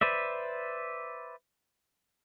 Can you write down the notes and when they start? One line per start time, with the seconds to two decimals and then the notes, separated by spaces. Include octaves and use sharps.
0.01 B4 C5 D5 E5